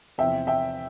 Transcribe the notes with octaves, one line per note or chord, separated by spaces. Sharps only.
E2 C3 F3 C4 E5 G5
E5 G5